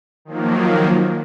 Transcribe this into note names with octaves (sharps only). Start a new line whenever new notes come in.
D#3 F3 F#3 A#3